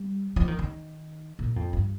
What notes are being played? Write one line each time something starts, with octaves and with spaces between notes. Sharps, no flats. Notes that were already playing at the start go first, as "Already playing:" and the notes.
Already playing: G3
F3
D#3
D#3
A#2
F2
G2